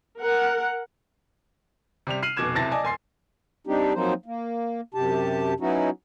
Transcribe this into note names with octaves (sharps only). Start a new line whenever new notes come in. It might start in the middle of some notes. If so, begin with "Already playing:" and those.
A#4 F#5
C3 G3 F7
F6 C7 D#7 F#7
F1 B2 D6 G#6 E7
D1 C3 E4 A5 A6 A#6
D5 D#5 G#5 A5 D6
E1 G#5 C6 C7
G3 C4 D4 D#4 G4
F3 F#3 A#3 C4 D#4 C5
A#3
F#2 C3 G4 A5
F#3 B3 C#4 D#4 E4 F#4